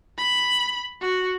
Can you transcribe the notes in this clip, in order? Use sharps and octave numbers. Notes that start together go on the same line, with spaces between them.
B5
F#4